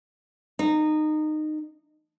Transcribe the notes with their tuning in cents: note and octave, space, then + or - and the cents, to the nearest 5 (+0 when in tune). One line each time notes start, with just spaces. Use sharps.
D#4 -20